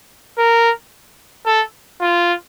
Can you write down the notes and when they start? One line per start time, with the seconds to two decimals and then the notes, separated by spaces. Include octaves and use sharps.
0.38 A#4
1.46 A4
2.01 F4